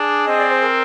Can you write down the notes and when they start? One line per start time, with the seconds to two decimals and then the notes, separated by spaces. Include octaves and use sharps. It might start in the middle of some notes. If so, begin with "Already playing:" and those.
Already playing: D4 G#4
0.26 C4 D#5
0.38 D5
0.51 C5
0.62 A#4